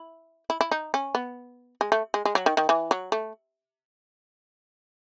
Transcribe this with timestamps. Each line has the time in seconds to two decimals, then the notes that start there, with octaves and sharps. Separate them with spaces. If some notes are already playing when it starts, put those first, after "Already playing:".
Already playing: E4
0.50 E4
0.61 E4
0.71 D#4
0.94 C#4
1.15 B3
1.81 G#3
1.92 A3
2.14 G#3
2.25 G#3
2.35 F#3
2.46 D#3
2.57 D#3
2.69 E3
2.91 F#3
3.12 A3